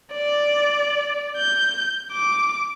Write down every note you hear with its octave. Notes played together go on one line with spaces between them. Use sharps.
D5
G6
D6